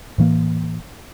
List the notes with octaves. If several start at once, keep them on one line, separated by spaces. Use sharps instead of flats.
A2 E3 A#3